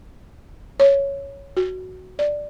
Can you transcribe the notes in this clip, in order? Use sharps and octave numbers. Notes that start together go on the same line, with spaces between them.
C#5
F#4
D5